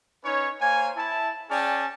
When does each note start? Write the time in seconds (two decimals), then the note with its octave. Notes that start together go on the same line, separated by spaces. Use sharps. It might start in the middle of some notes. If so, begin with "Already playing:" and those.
0.24 C#4 D#4 B4 C#5
0.61 A#3 C5 C#5 G#5
0.96 E4 A5
1.50 C#4 G#4 D5 G5 A5